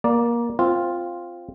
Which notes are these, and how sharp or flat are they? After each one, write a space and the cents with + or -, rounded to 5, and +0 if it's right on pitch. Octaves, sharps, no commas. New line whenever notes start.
A#3 +20 D5 +0
C4 +5 F4 +0